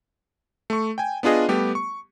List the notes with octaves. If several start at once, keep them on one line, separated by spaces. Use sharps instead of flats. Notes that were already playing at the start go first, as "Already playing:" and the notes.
A3 C#6
G5 G#5
B3 D4 F4 G#4 D#5
G3 A3 B3 G4
C#6